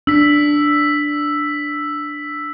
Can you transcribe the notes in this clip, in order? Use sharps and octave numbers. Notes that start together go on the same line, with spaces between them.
D4 E6 B6